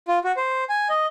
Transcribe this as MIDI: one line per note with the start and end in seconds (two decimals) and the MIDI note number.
0.08 0.19 65
0.24 0.32 66
0.37 0.64 72
0.70 0.88 80
0.89 1.06 75